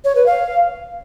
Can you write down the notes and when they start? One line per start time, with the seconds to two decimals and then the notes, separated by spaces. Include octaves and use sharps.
0.04 C#5
0.15 B4
0.26 F5